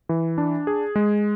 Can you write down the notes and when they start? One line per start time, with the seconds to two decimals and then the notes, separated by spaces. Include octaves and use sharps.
0.09 E3
0.38 D4
0.67 G#4
0.96 G#3